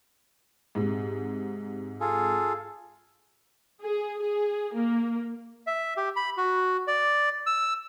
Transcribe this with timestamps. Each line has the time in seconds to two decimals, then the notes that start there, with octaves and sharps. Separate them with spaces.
0.75 G#2 C3
2.01 F4 G#4 A4
3.81 G#4
4.21 G#4
4.74 A#3
5.67 E5
5.97 G4
6.16 B5
6.37 F#4
6.87 D5
7.47 E6